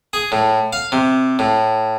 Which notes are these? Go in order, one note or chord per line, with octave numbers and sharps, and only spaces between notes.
G#4
A2
F5
C3
A2